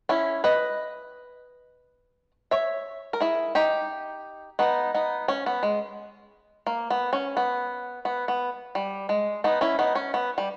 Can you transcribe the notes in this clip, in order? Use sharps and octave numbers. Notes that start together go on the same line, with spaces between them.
C#4 E4
B4 D#5
C#5 E5
A#4
E4 G#4
D#4 G4
B3 D#4
B3 D#4
C#4
B3
G#3
A#3
B3
C#4
B3
B3
B3
G3
G#3
B3 D#4
C#4 E4
B3 D#4
C#4
B3
G3